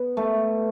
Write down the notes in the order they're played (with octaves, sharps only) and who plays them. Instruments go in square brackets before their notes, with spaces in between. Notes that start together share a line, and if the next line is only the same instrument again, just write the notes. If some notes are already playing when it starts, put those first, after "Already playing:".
Already playing: [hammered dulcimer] B3
A3